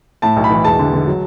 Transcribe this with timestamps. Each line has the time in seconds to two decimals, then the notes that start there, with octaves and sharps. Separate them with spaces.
0.22 A2 A5
0.36 B1
0.44 B5
0.50 E3
0.64 E1 A5
0.79 D3
0.94 D3
1.07 F#3